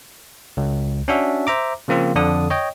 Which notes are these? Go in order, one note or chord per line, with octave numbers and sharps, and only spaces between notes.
C#2
C#4 D4 F#4 E5
C5 E5 A#5 D6
C#3 F3 A#3 C4 F4
F2 D3 D4 D#6
C#5 D#5 G5